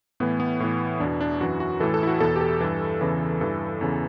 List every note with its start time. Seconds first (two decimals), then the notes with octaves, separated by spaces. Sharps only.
0.20 A2 E3 B3
0.40 B3
0.60 A2 E3
1.00 E2 B2 D4
1.21 D4
1.41 F#2 E3 F#4
1.60 F#4
1.80 A2 E3 A4
1.94 A4
2.03 E4
2.07 F#4
2.20 E2 B2 A4
2.36 G4
2.41 A4
2.61 G2 E3
3.01 E2 C#3 E3
3.41 G2 E3 A4
3.81 E2 C#3 E3